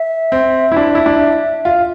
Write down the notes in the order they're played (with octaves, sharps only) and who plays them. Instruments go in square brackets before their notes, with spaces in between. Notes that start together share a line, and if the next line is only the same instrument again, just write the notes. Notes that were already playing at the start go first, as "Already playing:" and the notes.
Already playing: [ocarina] E5
[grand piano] C4
E4
D4
E4
D4
F4